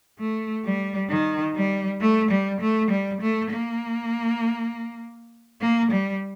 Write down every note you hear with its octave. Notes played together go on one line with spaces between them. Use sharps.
A3
G3
D#3
G3
A3
G3
A3
G3
A3
A#3
A#3
G3